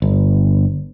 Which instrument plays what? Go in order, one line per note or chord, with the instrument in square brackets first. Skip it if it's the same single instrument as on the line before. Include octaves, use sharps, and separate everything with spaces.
[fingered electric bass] G1